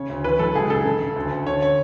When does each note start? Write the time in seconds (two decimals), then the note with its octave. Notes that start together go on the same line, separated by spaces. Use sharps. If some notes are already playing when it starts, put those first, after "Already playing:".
Already playing: C#3 C#5
0.09 D2
0.24 E3 B4
0.39 F#2 A4
0.55 C#2 G#4
0.70 C#3 A4
0.85 C#3
1.00 C#3
1.16 D2
1.32 D2
1.46 D3 C#5
1.62 C#5